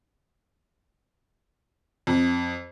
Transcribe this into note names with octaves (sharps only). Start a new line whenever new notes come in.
F2